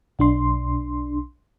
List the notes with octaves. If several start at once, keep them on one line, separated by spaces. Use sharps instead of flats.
B1 D4 C6